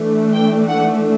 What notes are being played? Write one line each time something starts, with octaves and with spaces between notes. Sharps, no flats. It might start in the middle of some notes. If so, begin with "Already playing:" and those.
Already playing: E3 A3 D4
G5
F#5